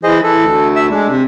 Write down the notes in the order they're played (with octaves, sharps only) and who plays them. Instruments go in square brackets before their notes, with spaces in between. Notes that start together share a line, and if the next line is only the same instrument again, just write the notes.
[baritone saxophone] E3 [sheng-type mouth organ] G#4 C5 D#5
[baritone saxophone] E3 [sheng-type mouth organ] A4
[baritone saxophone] D2
[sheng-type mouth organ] E5 E6
[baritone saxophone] G#3 [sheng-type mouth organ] D4
[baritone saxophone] C3